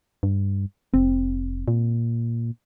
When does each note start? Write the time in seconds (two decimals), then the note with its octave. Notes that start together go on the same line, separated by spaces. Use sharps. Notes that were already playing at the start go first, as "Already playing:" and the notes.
0.23 G2
0.94 F1 C4
1.68 A#2